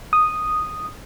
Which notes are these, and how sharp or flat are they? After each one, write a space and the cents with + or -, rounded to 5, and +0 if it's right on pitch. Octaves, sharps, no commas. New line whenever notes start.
D#6 -5